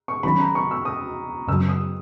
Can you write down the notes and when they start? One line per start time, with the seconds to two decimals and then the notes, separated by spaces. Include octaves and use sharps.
0.08 C#6
0.23 D#3 F#3 C#4 B5
0.40 A#5
0.55 C#6
0.71 E6
0.85 D#6
1.48 F#2 C#3 F#3 E6
1.69 D#6